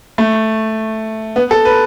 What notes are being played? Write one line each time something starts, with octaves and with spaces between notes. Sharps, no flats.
A3
B3
A4
B4